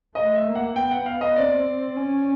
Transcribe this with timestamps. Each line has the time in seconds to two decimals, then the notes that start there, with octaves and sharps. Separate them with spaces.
0.15 A3 D#5
0.35 E5
0.46 A#3
0.55 F#5
0.76 B3 G5
0.91 F#5
1.06 F5
1.21 D#5
1.36 C4 D5
1.97 C#4